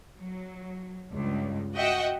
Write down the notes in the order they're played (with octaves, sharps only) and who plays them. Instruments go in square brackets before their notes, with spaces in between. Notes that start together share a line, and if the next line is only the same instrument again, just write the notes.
[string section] F#3
C#2 G2
F#4 D#5 E5 F#5 G5